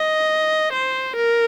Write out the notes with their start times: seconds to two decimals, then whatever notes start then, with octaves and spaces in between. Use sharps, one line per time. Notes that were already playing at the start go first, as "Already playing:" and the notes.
Already playing: D#5
0.73 C5
1.16 A#4